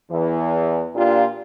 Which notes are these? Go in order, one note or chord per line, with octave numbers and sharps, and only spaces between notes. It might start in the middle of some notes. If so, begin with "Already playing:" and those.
E2 E3
A#2 A#3 D4 F4 G4